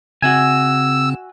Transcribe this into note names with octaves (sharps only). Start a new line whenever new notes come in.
C#3 C4 F#4 E5 G#5 E6